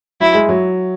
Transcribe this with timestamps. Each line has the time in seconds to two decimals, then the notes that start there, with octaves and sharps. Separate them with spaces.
0.20 F#3 E4
0.34 G#3
0.49 F#3